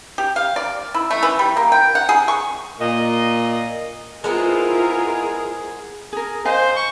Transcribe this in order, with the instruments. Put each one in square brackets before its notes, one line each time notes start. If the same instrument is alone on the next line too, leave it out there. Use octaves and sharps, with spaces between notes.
[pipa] G4
F5
D5
E4
A3
E3
G3
A#3
G5
F#5
G#4
C#6
[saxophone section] A#2 D#5
[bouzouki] G#3 B3 C4 [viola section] E4 F4 A#4 [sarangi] G#4
[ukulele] G#4 A#4
[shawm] C5 [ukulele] D#5 F5 G#5
[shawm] C#6